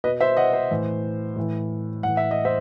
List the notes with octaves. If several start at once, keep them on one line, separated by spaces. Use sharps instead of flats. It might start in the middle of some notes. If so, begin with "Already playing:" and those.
B2 B4 D#5
C5 E5
D#5 F#5
C5
A2 E3
A2 E3
A2 E3 F#5
E5
D#5
C5 E5